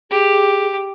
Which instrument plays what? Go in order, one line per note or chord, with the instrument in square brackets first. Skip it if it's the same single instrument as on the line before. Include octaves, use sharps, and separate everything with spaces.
[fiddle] G4 [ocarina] G#4